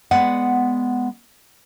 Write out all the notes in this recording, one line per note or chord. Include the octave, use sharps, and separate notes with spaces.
G#3 B3 D5 F#5